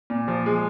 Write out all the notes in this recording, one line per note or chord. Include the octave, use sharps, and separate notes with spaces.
A#2
F3
G#3